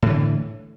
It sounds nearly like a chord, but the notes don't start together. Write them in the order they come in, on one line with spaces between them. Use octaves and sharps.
A2 E3 D3